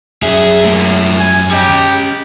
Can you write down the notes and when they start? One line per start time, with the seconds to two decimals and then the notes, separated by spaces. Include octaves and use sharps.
0.22 F#2 G#4 E5
0.64 A2 A#3
1.19 G#5
1.51 C#4 G4 D#5